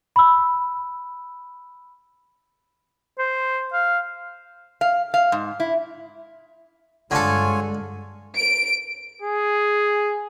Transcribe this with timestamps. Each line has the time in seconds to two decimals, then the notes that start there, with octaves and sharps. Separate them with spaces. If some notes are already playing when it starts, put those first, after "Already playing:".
0.16 B5 E6
3.19 C5
3.73 F5
4.81 F5
5.14 F5
5.32 G#2
5.60 E4
7.11 G2 D3 G#3 F4 A4 C#5 G#5
8.37 D7
9.22 G#4